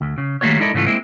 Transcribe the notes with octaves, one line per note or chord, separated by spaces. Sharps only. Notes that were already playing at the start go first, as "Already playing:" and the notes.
D2
C#3
D#3 G3 A3 A#3 F#4 C#5
G#3 D#4 E4 A4 A#4 D5
G#2 C#3 E3 A3 F4
G#3 A#3 C4 E4